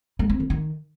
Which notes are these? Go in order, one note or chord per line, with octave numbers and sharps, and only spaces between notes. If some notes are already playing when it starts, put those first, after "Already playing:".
G#3
C4
E3
D#3